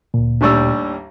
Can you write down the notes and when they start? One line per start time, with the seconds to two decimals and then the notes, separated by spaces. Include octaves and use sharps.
0.14 D2 A#2
0.41 A1 D#2 G3 D4 C#6 E6